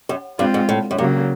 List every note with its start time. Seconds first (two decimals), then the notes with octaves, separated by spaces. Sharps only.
0.09 F#2
0.39 G2 G#3 C4 F4
0.54 G#2
0.69 A2
0.91 F#2
0.98 G2 C#3 F#3 A#3